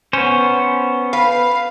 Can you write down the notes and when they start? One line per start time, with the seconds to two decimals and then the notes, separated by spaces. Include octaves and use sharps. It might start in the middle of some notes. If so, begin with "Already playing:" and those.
0.13 B3 C#4 C5
1.13 B4 F5